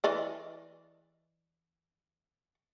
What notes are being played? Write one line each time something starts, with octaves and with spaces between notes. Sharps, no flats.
E3 D5 D#5